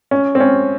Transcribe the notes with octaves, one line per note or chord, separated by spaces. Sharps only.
C#4
C4
C#4